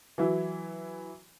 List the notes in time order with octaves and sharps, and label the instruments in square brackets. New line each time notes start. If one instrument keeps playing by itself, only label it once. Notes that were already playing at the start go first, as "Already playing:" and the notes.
[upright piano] E3 F#3 E4